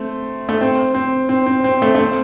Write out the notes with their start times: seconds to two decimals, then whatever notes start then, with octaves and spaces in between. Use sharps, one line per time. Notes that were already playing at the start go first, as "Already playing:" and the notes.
Already playing: A3 C4
0.49 A3
0.61 C4
0.94 C4
1.29 C4
1.46 C4
1.64 C4
1.82 A3
1.95 A3
1.99 C4